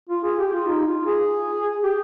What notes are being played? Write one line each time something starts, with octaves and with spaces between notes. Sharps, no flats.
F4
G#4
G4
F4
D#4
F4
G#4
G4